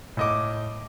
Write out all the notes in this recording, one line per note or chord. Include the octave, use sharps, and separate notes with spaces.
A2 D#5 D6